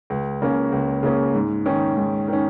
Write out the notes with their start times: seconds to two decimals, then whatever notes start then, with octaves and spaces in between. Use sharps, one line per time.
0.10 C#2
0.42 C#3 A#3 C#4
0.72 C#2
1.03 C#3 A#3 C#4
1.35 G#2
1.66 D#3 C#4
1.96 G#2
2.28 D#3 C#4